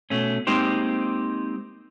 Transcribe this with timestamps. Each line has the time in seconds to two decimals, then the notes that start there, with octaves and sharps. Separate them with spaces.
0.10 B2 A3 C#4
0.47 G#3 A#3 C4 D#4 G4 C5